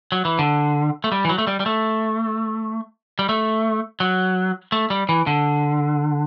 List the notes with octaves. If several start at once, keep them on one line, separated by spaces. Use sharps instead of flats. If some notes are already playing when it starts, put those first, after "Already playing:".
F#3
E3
D3
A3
G3
E3
F#3
A3
G3
G3
A3
G3
A3
F#3
A3
G3
E3
D3